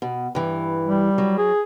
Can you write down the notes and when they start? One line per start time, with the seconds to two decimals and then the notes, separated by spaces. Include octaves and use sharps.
0.02 B2
0.35 G2 E3
0.85 G3
1.18 F#3
1.38 G#4